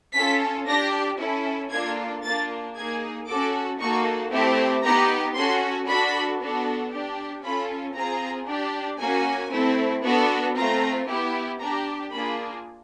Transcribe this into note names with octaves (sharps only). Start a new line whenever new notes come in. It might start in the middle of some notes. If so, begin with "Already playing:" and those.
C#4 F4 A4 B6
D4 G4 A#6
C#4 E4 A4
A#3 D4 F4 A4 G#6
A#3 D4 F4 A6
A#3 D#4 G#4 G#6
C#4 F#4 A4 D6
A#3 D#4 F#4 A4 C#6
A3 C4 E4 G4
B3 D#4 G4 A#5
C#4 F#4 A4 C6
D4 F#4 A4 B5
B3 D4 F#4 A4
D4 G4
C#4 F4 A4 B5
C4 F4 G#4 A#5
D4 G4
A#3 C#4 F#4 G#5
A3 C4 E4
B3 D4 F#4 A4
A3 C4 F4 A#5
B3 E4 G4
D4 G4 A#5
A#3 D4 F4 G#4 B5